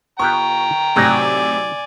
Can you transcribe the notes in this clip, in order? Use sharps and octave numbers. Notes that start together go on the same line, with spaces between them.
B3 F4 G4 G5 A#5 C#6
A2 C3 F#3 D#4 D5 G#5